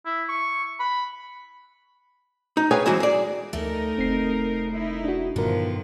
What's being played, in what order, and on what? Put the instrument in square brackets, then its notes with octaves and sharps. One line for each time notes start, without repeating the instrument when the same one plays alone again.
[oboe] E4
C#6
B5
[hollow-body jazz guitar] D#4
G#4 B4 C#5 F5 G5 G#5
E3 F#3 G#3 C4 E4
G#4 D5
[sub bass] D2 [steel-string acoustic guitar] A3 [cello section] D#4 A#4
[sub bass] F1 [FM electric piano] C4 C7
[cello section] D#4 E4
[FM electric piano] D4 F#4
[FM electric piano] G2 A#4 [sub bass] A#2 [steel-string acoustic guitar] D3 B3 [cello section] D#3 F3